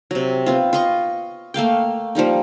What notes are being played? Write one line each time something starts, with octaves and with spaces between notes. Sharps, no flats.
C3 F#3
B3 C4 F4
F4 D#5 C#6
A3 A#3 F5 G5
F3 G3 A#3 D#4